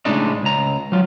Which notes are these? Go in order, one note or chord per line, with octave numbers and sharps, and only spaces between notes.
A2 C#3 G#3 D4 D#4
C#2 A#5
F#3 F4